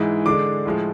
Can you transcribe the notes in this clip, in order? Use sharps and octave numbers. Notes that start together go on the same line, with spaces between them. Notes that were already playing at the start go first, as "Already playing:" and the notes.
Already playing: G#2 E3 G#3
D3 G#3 D4 D6
A2 F3 G#3